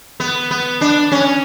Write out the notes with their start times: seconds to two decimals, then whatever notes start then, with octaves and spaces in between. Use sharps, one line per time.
0.20 B3
0.51 B3
0.81 D4
1.12 C#4